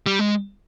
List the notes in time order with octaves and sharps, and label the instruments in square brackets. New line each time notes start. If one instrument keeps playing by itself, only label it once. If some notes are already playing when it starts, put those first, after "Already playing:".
[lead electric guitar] G3
G#3